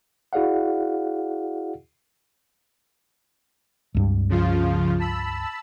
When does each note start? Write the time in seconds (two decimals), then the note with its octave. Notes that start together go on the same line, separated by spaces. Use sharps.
0.33 E4 F#4 G#4 D5 F5 F#5
3.94 C#2 G2 G3
4.29 C#3 F3 F4
4.99 A5 B5 E6